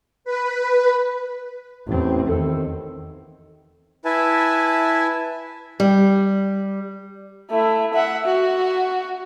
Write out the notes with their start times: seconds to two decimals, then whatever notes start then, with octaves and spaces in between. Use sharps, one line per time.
0.25 B4
1.87 A1 E2 C4
2.29 E2 D#3 C4 A4
4.05 E4 B4 E5 G#5 A5
5.80 G3
7.50 A3 E4
7.94 E5 F#5
8.26 F#4